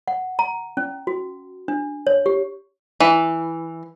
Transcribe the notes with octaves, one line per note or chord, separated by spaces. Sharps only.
F#5
A#5
C#4
F#4
D4
C#5
G4
E3